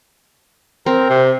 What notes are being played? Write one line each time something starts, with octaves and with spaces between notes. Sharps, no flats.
C4 A#4
C3